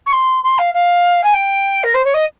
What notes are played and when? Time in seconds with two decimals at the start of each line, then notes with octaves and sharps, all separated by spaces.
0.06 C#6
0.13 C6
0.43 C6
0.58 F5
0.74 F5
1.24 G#5
1.34 G5
1.83 A#4
1.94 C5
2.05 C#5
2.14 D#5